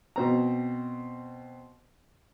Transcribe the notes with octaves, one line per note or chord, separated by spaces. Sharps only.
B2 C4 A#5